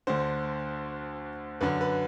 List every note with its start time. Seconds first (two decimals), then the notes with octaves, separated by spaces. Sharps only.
0.07 D2 D3 C5
1.61 F#2 D3 B4
1.81 B4